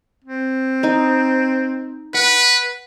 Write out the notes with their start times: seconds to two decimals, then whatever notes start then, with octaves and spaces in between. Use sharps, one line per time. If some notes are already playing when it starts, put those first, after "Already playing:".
0.24 C4
0.83 D#4 D#5
2.14 B4 F#5